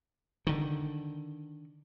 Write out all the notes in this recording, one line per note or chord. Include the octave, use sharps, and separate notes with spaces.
D3 D#3